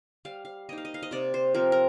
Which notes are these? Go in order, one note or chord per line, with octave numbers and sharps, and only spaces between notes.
G3 F5
F5
A#3 D#4 D#5
F5
D#5
F5
D#5
C3 D5
C5
F3 C4 A#4
A#4